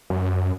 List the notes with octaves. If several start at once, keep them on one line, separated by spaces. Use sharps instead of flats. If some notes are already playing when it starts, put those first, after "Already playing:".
F#2